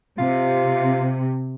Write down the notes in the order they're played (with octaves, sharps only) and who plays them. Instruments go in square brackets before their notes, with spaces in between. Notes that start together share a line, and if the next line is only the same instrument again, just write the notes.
[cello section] C3 [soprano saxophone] F4